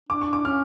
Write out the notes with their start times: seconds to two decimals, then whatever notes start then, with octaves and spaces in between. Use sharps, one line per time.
0.09 D4 D6
0.21 C#6
0.33 D6
0.45 C#4 F6